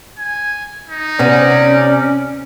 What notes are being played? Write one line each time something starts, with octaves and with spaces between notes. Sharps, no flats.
G#5
D#4
C3 B3 C#4 D5